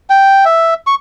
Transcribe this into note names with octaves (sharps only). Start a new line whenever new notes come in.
G5
E5
C#6